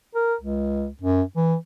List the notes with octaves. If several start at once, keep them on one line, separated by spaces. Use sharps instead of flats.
A#4
C#2
F#2
E3